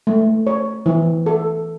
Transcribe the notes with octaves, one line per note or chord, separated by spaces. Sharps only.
A3
C#5
E3
A4